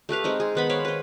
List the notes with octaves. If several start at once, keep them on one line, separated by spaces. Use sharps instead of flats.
A3 G4 B4 F5
G#3 C4 D#4
G#4
D#3 B3 B5
C5 C#5 F5 B5
B4 C5